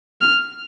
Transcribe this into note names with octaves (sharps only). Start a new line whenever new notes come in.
F6